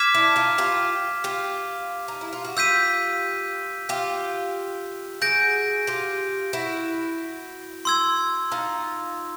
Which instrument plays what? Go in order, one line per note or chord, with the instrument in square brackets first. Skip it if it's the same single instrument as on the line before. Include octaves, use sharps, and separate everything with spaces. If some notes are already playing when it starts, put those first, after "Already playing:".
Already playing: [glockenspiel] D6 F6 G#6 B6 E7
[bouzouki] D4 E4
D#4 F4
F4 G4
F4 G4
D#4
E4
F4
F#4
[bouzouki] F4 G4 [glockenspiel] E6 G6 B6 D#7
[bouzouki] F4 G4
[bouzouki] F#4 G#4 [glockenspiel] G6 A#6 D7
[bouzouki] F4 G4
E4 F#4
[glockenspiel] C6 E6 G#6
[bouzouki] D#4 F4